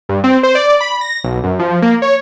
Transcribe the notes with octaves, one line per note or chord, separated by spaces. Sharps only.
G2
C4
C5
D5
B5
A#6
B1
F#2
F3
A#3
C#5